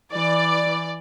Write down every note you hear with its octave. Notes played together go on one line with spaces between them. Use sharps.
E3 D5